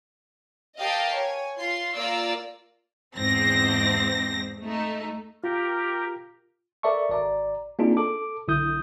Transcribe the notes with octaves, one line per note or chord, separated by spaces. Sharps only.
G4 A#4 D#5 F5 G5 A5
C#5 G#5
F4 C6
A#3 F4 D5 A#5 E6
E2 G#2 C4 A#6
A3 D#4
F4 G4 A#4
A4 A#4 D5 E5 A5 C#6
G#1 D5 A#5
A#3 C4 D4 D#4 F4 G#4
A4 A5 D6
B1 D3 E4 D#6 G6